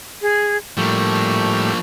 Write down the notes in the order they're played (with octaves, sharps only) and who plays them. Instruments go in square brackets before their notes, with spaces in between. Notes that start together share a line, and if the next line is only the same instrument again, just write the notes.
[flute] G#4
[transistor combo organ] A2 G3 [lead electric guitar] F3 A#3 [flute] C#6